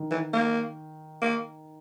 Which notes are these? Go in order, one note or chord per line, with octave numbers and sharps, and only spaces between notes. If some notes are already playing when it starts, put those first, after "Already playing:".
Already playing: D#3
E3
A#3
A#3